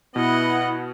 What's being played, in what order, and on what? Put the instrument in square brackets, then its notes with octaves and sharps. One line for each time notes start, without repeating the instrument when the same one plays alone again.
[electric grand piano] B2 [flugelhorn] B3 [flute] E4 [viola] D#5 F#5